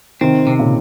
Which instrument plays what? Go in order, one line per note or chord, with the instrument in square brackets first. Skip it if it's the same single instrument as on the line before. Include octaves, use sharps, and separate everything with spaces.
[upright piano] C3 D#3 [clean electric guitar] C4
[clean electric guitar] C3
[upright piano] A#2 C#3